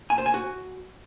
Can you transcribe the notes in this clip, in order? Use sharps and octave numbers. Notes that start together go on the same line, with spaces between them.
G#5
C5
G#5
F#4